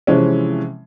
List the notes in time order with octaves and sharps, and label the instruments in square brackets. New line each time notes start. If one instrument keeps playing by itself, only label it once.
[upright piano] C3 E3 F3 G#3 C4 C#4